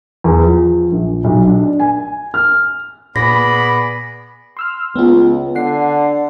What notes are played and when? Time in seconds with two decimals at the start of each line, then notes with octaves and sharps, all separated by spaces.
0.24 E2
0.42 F3
0.92 A#1
1.24 B1
1.47 D4
1.80 G#5
2.34 F6
3.16 A#2 B3 G#4 D5 B5 A#6
4.57 C6 E6 F6
4.96 C#2 B3 F4
5.55 D3 F#5 C7